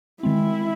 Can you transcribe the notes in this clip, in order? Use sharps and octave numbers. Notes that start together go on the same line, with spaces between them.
D#3 G#3 C4 E4